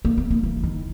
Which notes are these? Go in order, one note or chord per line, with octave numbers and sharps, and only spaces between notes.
A#3
B3
A#3
E3
D#3